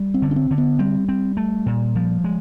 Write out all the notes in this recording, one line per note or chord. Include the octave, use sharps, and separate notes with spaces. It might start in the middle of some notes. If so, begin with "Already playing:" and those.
Already playing: G3
C4
D3
C#4
C4
D3
B3
G3 C4
C4
A3
A#2
F3
G#3